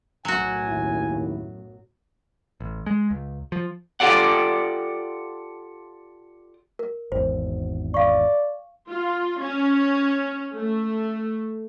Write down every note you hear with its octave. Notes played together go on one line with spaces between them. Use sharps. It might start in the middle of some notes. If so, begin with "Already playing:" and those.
B1 F#2 A2 F#3 F#4 G#5
D#2 E4
A1
G#3
C#2
F3
F4 G4 A4 D5 F#5
A#4
G#1 E2 C5
D5 F5 C#6
F4
C#4
A3